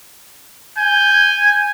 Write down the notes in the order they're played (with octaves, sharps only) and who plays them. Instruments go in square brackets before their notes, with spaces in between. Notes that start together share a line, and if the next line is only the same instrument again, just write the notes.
[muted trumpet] G#5 [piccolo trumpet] G6